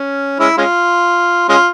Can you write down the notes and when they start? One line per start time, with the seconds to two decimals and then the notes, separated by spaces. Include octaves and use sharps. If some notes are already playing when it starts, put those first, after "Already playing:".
Already playing: C#4
0.40 G#3 C#4 E4
0.58 G#3 C#4 F4
1.49 G#3 C#4 F4